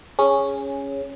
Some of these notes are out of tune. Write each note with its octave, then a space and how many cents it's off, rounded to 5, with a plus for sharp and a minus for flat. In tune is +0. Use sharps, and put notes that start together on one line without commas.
C#4 +0 G#4 -10